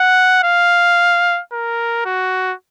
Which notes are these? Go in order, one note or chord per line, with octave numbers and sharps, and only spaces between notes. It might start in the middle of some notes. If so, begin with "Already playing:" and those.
Already playing: F#5
F5
A#4
F#4